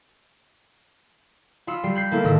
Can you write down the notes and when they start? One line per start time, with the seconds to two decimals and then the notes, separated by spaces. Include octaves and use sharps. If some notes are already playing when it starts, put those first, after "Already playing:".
1.67 F4 B5 E6 C#7
1.83 G3 G4 C7
1.95 B5 G6 C7 C#7
2.12 A#3 E4 A4
2.24 G#1 A2 D#3 E6 A#6